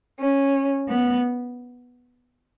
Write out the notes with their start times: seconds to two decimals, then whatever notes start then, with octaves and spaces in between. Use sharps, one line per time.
0.19 C#4
0.89 B3